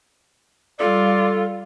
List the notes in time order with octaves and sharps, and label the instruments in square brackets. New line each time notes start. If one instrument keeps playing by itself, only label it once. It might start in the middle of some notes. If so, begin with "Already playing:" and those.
[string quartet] G3 F4 [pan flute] A4 [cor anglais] D5